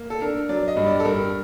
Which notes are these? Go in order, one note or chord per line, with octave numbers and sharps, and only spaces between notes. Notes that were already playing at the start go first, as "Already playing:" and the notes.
Already playing: A#3
A4
D4 A#4
F#3 D5
D#5
G2
D5
A4
G2 A#4